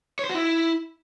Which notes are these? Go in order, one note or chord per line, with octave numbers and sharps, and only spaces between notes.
C#5
C5
F#4
E4